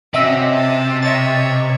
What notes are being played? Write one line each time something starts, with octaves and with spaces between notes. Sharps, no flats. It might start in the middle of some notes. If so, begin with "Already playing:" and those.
C3 C#4 F#4 D#5 E5 E6
A5
C#5 D#5 E5 A6